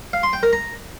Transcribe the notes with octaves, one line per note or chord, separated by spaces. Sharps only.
F5
C6
G5
A#4
A#5